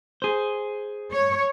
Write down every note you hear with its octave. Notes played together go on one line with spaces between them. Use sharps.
G#4 C5
C#5